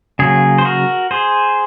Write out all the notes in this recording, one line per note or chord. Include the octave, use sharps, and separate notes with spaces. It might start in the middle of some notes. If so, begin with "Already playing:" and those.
C#3 F#3 A#3 G#4
C5
F#4 A#4
G#4 C5